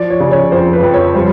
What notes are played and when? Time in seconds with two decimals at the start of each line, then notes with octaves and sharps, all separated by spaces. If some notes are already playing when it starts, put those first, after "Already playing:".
Already playing: F3 D5
0.10 C#5
0.20 C#3
0.31 C#5
0.52 F2 C5
0.73 B4
0.83 F2
0.94 C#5
1.14 G3 C5